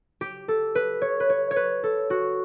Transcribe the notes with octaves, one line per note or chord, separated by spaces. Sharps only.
G4
A4
B4
C#5
B4
C#5
C#5
B4
A4
F#4